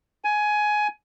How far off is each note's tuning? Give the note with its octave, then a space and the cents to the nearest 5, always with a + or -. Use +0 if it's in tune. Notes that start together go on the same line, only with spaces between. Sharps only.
G#5 +15